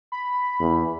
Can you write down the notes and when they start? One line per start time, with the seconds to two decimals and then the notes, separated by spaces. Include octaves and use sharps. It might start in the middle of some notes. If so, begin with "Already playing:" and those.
0.12 B5
0.60 E2